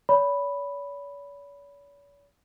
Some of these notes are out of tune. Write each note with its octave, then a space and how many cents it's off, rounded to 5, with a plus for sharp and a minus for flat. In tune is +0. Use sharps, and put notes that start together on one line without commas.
C#5 +45 B5 +0